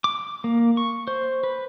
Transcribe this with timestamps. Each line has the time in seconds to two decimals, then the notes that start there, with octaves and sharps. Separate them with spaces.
0.04 D6
0.44 A#3
0.77 C#6
1.08 C5
1.44 B4